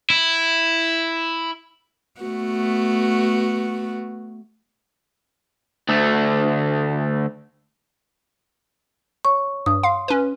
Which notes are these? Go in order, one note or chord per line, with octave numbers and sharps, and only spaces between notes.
E4
A3 B3 F#4
D2 A3
C#5 C#6
G2 D#6
F5 C6
C#4 B4